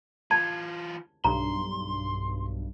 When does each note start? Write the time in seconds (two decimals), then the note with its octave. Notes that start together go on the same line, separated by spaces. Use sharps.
0.31 E3 F4 A5 G#6
1.24 B1 G2 A#5 C6